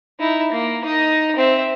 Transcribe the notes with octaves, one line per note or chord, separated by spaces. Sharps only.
D#4 E4
A#3
D#4 D#5
C4 E5